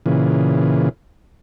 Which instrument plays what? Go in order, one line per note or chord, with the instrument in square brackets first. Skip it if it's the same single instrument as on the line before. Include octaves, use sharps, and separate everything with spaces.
[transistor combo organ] A#2 C#3 E3